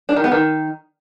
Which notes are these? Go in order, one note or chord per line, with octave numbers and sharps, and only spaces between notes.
D4
D#3
B3
D#3